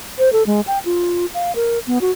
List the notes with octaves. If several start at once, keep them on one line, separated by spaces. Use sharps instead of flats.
C5
A4
G#3
G5
F4
F5
A#4
B3
F#4